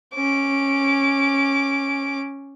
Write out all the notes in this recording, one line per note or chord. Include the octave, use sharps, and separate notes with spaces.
C#4 D6